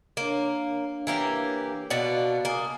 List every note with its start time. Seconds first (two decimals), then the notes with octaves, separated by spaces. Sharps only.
0.17 A#3 D4 C#5 F5
1.07 E3 A#3 G4
1.90 B2 D4 F#4 D#5 F5 F#5
2.45 A#3 G#5 D#6